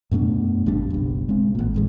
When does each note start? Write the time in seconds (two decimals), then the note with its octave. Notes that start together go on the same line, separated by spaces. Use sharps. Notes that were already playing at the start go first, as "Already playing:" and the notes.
0.11 F#2 B2 A3 D4
0.66 G#1 F2 G3 D4
0.90 F#1 B1
1.29 G#3 C4
1.55 G#1 A#2
1.74 D1 A1 G#3